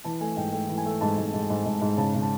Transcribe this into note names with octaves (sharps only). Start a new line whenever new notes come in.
E3 A5
A3 G#5
G#2 G5
A3 G5
E3
G#5
A3
G#2 A5
G#2
G#2
G#2
G#2
G#2
C#3 A5
C#3
A5